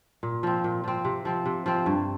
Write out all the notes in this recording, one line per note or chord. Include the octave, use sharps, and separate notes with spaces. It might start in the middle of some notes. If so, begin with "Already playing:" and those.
A#2
F3 C4
A#2
F3 C4
C3
F3 C4
C3
F3 C4
G2